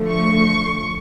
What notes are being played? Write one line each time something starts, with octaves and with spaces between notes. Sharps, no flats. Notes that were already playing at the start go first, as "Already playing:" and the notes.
Already playing: D3 F3 A3
C#6